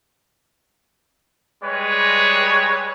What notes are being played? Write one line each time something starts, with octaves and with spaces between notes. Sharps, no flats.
G3 G#3 B4 C#5